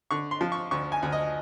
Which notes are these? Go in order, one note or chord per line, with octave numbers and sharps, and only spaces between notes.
D3 C#6
C6
F3
C#6
D2 C#6
G#5
D2
D#5